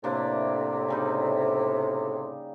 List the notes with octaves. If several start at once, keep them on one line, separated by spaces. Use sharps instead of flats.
A2 C3 A#3 D4
C#3 G3 D#4